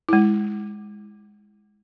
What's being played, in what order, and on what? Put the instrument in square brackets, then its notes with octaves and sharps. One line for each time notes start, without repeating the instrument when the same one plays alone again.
[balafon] G#3 E4